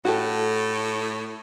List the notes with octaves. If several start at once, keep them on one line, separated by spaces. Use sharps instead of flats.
A2 F#4 G4 A4